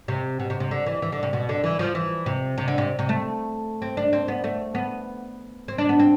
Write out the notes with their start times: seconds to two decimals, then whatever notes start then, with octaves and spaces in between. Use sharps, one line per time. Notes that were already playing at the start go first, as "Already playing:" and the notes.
0.08 C3
0.39 B2
0.50 C3
0.60 C3
0.71 D3
0.86 E3
1.02 E3
1.12 D3
1.23 C3
1.33 B2
1.49 D3
1.64 E3
1.79 F3
1.95 E3
2.26 C3
2.58 C3
2.68 D3
2.78 C3
2.99 C3
3.09 A3
3.82 C4
3.97 D4
4.13 C4
4.28 B3
4.44 A3
4.75 B3
5.68 C4
5.78 D4
5.89 B3
5.99 C4